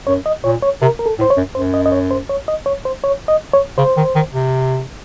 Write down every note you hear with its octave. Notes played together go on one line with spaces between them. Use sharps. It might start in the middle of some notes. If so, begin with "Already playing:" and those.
F#2 C#5
D#5
A#2 C#5
C#5
C3 A#4
A#4
A4
A2
C5
C#5
F#2
F#2 C5
D#5
D#5
C#5
C5
C#5
D#5
C#5
C5
C#5
D#5
C#5
C#3 C5
D#3
D#3
C3